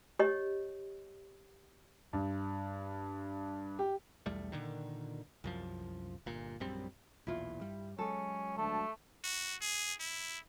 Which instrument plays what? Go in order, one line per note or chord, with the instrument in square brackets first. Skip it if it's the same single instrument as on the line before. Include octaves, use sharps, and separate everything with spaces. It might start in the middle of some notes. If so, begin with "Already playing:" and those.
[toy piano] G4 C#5 D#5
[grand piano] G2
G4
[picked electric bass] B1 E2 G3 A3
A#2 D3 D#3
C2 F#2 F3
G1 A#2
A#1 F#2 G3 C4
[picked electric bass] B1 E2 A#2 [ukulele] E4 F4
[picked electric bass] G2 G3
[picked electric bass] F#3 G#3 [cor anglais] C#4 [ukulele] A4
[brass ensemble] D2 D3 A5 [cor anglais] A3
[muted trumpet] F#4
G#4
E4